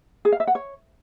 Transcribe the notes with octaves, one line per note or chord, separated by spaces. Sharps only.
G#4
F5
E5
F#5
C#5